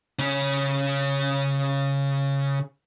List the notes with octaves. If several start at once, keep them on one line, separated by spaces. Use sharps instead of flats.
C#3 C#4